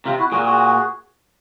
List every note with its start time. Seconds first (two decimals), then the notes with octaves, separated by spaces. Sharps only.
0.05 C3 F4
0.19 E4 F#4
0.32 A#2 F#4 G#4
0.45 F#4 G#4